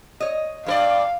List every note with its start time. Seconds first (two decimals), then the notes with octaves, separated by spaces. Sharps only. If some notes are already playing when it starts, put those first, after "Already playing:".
0.20 C#5 D#5
0.67 G2 A#4 D5 F5